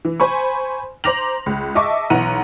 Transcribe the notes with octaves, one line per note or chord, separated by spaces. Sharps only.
E3
C5 G#5 B5 C#6
C5 A#5 D6 A#6 F7 F#7
C#2
D#5 E5 A5 C#6 D6
B1 E3 F#5 A#5 D#7